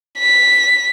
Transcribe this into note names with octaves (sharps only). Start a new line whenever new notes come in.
B6